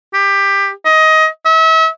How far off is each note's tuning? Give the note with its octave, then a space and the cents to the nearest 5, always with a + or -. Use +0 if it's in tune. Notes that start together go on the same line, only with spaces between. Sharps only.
G4 +20
D#5 +20
E5 -40